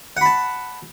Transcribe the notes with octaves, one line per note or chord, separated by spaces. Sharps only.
F#5 A5 B5